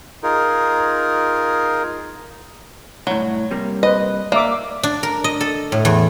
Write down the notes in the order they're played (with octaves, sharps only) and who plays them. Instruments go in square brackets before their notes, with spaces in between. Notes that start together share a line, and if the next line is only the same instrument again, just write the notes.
[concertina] D#4 F4 G#4 A#4
[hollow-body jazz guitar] C2 A2 [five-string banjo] F#3
[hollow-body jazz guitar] C3 G3 A#3
[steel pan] B4 C5 [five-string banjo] D#5
[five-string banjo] A#3 [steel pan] D5 E5 D6
[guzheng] D4
A#4
D#5
A4
A2
E2